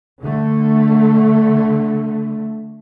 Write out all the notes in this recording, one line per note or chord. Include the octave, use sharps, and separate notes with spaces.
D3 A3